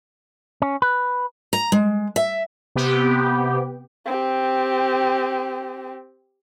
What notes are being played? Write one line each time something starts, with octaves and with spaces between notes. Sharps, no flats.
C#4
B4
A#5
G#3
E5
C3 B3 G4
C4 G4